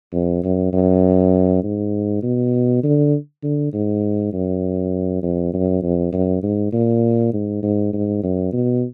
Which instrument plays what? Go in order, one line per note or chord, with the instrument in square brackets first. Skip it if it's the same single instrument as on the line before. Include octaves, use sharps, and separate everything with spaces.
[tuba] F2
F#2
F#2
G#2
B2
D3
D3
G#2
F#2
F2
F#2
F2
F#2
G#2
A#2
G#2
G#2
G#2
F#2
B2